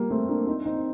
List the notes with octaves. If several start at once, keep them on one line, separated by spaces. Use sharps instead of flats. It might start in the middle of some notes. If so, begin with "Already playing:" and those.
Already playing: G3 A#3
A3 C4
A#3 D4
C4 D#4
C4 D#4